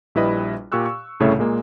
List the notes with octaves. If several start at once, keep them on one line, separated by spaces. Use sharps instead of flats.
A#1 G3 E4 B4 D#5 B5
A#2 G4 C#6 E6 F#6
C#6
C2 A2 C#3 A3 C#5 E5
A#2 G#3 A#3